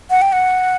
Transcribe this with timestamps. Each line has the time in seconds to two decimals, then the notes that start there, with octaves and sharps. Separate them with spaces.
0.10 F#5
0.22 G5
0.32 F#5